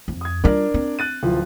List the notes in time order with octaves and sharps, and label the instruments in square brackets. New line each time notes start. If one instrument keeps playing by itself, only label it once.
[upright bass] F2
[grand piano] D#6 G#6
[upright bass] G3 F4 [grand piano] D4 A#4 D5
[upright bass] C4
[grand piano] F#6 A6 D#7
D1 F3